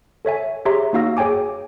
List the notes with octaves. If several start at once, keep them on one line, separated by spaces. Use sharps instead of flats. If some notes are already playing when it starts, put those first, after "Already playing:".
A4 C#5 E5 G#5
G4 G#4 C#5 E5 A#5 C6
A#3 D#4 F#4 F5 E6 A#6
G#4 C#5 G5 G#5 D6